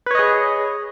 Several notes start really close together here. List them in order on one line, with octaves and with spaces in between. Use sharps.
B4 C#5 D#5 G#4